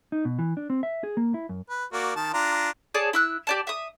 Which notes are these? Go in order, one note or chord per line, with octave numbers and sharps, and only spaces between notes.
D#4
B2
E3
D4
C4
E5
G#4
A#3
E4
F#2
B4
A#3 F#4 D5
D#3 A5
D4 F4 A#5
G#4 C#5 D5 A5
E4 E6 F#6
G4 D5 A5
E5 D#6